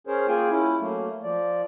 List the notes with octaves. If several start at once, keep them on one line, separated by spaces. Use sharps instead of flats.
C#4 G#4 A#4 C5 C#5
A#3 F4 G#4 G5 G#5
C#4 E4
F#3 A3 A#3
F3 D5